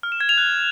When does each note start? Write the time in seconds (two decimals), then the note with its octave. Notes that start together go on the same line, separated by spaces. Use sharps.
0.03 F6
0.12 E7
0.21 G#6
0.29 F7
0.38 F#6